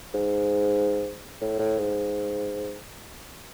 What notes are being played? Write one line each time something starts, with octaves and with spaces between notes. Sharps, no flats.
G#2
A2
A2
G#2